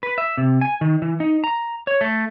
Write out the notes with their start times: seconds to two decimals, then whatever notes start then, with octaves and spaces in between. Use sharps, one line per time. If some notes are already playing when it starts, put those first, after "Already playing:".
0.03 B4
0.18 E5
0.37 C3
0.61 G#5
0.81 D#3
1.02 E3
1.20 D#4
1.44 A#5
1.87 C#5
2.01 A3